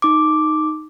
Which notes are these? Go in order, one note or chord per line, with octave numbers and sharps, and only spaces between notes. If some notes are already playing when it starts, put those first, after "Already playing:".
D#4 D6